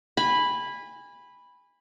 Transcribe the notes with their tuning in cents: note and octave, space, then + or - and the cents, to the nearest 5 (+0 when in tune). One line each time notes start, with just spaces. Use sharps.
G#5 -25 B5 +0